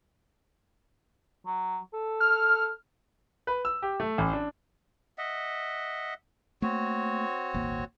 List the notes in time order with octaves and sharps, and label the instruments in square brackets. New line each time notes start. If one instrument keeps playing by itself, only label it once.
[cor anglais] F#3
A4
[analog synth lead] F6
[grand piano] B4
E6
G4
A3
A1
D4
[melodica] D#5 E5 F#5
[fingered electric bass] A3 A#3 [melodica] C4 F#4 C#5
[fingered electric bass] D#1 G#1 A#3